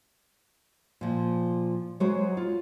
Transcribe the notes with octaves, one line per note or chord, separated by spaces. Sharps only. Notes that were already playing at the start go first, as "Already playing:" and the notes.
A#2 F3
F#3 G#3 F#4 C5 C#5
F4